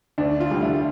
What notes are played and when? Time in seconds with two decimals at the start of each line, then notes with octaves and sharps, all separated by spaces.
0.18 D2 D4
0.40 F4
0.51 D3 G3
0.62 E4